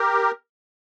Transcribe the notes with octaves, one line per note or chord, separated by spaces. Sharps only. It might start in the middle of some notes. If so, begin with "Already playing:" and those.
Already playing: G4 A#4